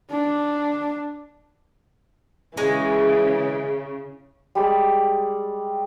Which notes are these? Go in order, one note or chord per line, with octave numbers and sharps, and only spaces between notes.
D4
C#3 E3 G#3
G3 G#3 D5